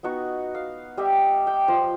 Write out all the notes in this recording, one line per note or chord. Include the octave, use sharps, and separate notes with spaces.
B3 D#4 F#4 C#6
F5
G3 G4 D#5 E5
G5
F3 C5 F5